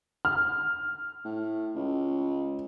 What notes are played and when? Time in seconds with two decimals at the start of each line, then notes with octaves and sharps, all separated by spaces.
0.25 F6
1.25 A2
1.75 C#2